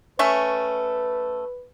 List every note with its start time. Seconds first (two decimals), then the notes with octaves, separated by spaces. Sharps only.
0.19 A3 C#4 B4 E5